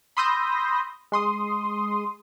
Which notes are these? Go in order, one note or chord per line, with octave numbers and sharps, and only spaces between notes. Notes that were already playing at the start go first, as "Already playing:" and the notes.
B5 C6 D#6 E6 G6 A#6
G#3 C6 D#6